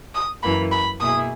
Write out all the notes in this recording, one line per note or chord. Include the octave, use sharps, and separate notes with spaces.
D#6
F#2 E3 A#3 B5
B5
B2 A#3 E4 G#4 D#6